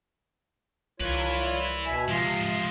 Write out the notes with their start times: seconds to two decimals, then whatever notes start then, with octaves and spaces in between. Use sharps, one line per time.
1.00 C2 E4 F4 B4 C#5
1.86 B2 E5 G#5
2.09 C3 F3 G#3 F4